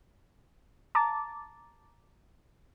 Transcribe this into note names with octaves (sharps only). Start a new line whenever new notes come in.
A5 A#5 D6 A6